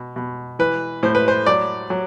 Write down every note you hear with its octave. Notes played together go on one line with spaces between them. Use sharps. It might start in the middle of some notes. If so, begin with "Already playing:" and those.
Already playing: B2
B2
E3 B4
A2 C5
B4
C5
F#3 D5
F#3